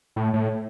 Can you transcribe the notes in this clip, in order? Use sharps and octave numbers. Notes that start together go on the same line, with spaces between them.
A2
A2